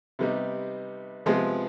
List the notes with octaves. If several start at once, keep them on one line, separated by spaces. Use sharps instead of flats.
C3 G3 B3 D#4
C3 F3 G#3 B3 F4